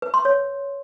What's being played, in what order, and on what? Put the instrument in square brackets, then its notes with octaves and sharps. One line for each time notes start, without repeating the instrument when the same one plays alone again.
[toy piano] B4
C6
C#5